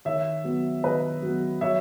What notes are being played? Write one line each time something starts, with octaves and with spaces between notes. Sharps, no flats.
D#3 C#5 E5
F#3 B3
D#3 B4 D#5
F#3 B3
F#3 C#5 E5